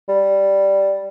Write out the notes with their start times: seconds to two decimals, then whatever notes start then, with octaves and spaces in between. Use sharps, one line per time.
0.09 G3